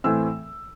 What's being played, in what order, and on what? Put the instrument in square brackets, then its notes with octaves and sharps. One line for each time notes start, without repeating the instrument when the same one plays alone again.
[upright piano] A2 E3 A3 C4 E6